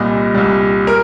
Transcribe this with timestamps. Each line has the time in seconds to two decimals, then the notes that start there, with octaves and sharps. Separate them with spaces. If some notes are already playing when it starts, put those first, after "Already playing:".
Already playing: C2 A#2 G3 D#5
0.34 C2 A#2 G3
0.87 A#4